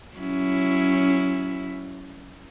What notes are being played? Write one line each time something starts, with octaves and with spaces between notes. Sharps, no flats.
F#3 C#4 E4